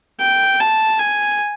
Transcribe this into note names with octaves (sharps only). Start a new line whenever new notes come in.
G5
A5
G#5